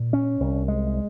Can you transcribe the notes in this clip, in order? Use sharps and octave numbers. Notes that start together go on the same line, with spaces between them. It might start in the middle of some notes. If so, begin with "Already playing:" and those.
Already playing: A#2
C#4
C2
G#3